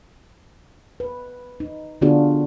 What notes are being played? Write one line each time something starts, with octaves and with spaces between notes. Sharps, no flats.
B4
D#4
D3 B3 D4 F4 F#4 G#4